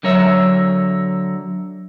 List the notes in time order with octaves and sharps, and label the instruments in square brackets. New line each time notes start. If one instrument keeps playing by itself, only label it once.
[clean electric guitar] D3 F#3 A#4 C#5 E5